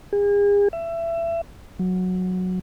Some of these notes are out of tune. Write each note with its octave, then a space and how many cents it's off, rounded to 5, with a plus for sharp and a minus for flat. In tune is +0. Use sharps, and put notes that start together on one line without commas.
G#4 -40
E5 +25
F#3 -10